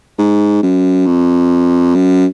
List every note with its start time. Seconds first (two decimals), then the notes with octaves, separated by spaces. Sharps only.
0.18 G#2
0.63 F#2
1.06 F2
1.95 F#2